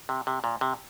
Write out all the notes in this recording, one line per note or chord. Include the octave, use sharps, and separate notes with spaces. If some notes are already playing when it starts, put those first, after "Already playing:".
C3
C3
A#2
C3